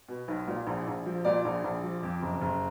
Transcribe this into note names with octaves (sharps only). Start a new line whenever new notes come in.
B2
B1
A#2
A#1
A#1
F3
A#2 D5
A#1
A#1
F3
F2
F#1
F#1